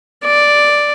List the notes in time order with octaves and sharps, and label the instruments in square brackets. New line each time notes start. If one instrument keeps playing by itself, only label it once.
[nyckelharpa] D5